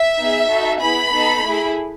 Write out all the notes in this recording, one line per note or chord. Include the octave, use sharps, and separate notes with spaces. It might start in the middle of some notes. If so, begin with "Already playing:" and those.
Already playing: E5
B3 D#4 G#4
D#4 F#4 A4
B3 E4 G#4 B5
B3 D#4 A4
A3 E4 G#4